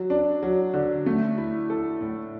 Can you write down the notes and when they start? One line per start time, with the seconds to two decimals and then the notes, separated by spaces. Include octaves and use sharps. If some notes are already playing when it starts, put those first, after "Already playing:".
Already playing: F#3
0.10 D4
0.43 F#3
0.74 D3
1.06 A3
1.38 E4
1.70 A4
2.01 A2